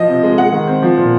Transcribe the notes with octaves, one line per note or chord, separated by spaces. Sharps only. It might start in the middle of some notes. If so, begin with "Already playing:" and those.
Already playing: F3 D#5
C3
G#3
G#3 F#5
D#3
C4
F3
A#2